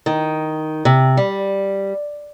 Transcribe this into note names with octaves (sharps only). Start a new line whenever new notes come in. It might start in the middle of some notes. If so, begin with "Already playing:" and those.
D#3
C3
G3